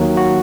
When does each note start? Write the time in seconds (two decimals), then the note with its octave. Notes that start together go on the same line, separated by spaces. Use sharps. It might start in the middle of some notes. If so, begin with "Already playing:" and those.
Already playing: D#2 D#3 F#3 A#3
0.17 F#4